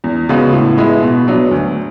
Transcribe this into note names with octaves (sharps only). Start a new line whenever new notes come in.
E2
C#3 G#3 B3 F#4
A2
G#3 B3 E4
B2
F#3 B3 D4
D2